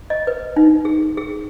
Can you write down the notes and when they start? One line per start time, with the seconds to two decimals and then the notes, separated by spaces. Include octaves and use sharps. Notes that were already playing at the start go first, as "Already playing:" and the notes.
0.10 D#5
0.27 B4
0.56 D#4
0.85 G#4
1.17 G#4